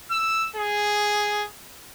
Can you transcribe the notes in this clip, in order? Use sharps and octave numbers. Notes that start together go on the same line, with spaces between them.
E6
G#4